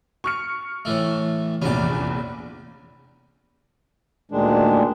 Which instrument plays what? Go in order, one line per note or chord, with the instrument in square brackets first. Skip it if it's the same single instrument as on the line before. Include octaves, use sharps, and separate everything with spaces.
[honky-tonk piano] C#6 F6 C#7
[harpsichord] A2 E3 A3
[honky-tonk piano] F1 A#1 E2 [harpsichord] C#4 D5
[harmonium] D2 A#2 D#3 G#3 D4